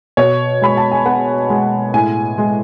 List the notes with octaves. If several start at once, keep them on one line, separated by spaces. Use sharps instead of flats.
B2 C#5
G#3 B5
A5
G#5
B3 F#5
G#3
A2 G#5
G#3